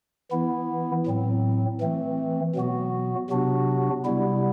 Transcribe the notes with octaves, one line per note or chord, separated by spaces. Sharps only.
E3 B3 E4
A2 F#3 C4
E3 A3 C4
B2 F#3 B3 F#4
C3 F#3 B3 D4 F#4
C3 G3 B3 E4